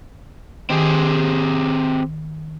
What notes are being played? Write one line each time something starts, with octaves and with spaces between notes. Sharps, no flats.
D#3 C4 G4 G#4